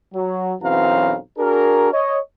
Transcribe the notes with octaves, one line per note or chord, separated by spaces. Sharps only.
F#3
B1 F#2 E3 C4 F5 A#5
D4 F#4 G#4 A#4
C#5 D#5